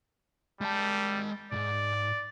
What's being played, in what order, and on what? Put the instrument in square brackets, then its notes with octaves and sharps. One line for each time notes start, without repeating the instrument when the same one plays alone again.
[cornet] G3 [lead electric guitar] G#3 A5
[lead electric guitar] B1 G#2 [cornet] D5